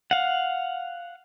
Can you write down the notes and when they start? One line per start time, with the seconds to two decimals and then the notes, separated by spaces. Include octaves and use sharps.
0.11 F5 F#5